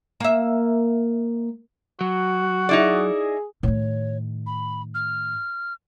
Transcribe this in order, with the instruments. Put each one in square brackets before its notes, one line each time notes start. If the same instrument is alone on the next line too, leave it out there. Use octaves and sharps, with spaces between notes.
[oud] A#3 E5
[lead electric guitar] F#3 [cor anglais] F#4
[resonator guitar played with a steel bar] D#4 E4 D5 [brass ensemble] G#4
[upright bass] A2 D#3 [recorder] C#5
[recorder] B5
F6